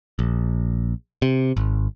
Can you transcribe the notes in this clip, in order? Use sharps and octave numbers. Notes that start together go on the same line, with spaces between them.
A#1
C3
G#1